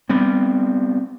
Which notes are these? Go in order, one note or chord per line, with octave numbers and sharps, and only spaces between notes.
G3 B3 C4